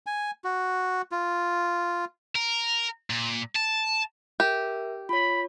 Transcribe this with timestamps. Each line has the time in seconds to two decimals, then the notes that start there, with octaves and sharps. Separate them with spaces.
0.06 G#5
0.44 F#4
1.12 F4
2.36 A#4
3.10 A#2
3.55 A5
4.40 G4 A#4 E5
5.09 F4 C#5 B5